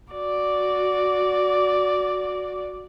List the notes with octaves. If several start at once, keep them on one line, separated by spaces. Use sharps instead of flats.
F#4 D5